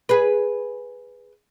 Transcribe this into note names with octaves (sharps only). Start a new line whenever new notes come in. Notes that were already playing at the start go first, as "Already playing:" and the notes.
G#4 B4